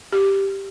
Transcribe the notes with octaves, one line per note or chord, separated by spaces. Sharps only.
G4